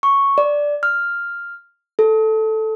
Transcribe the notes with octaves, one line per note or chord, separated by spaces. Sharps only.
C#6
D5
F6
A4